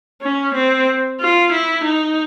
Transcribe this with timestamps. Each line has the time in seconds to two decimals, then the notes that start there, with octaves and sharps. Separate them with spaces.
0.22 C#4
0.54 C4
1.20 F4
1.52 E4
1.84 D#4